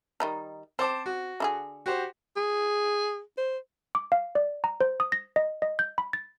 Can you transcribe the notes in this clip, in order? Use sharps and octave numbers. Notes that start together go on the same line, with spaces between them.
D#3 G3 D#4
C4 C5 A5 D6
F#4
D3 E4 G#4
F#4 G4 C5
G#4
C5
D6
F5
D5
A#5
C5
D#6
A#6
D#5
D#5
G6
B5
A6